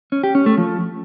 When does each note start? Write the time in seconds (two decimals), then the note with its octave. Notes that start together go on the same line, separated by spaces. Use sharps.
0.12 C#4
0.23 G4
0.35 C#4
0.46 A3
0.58 F3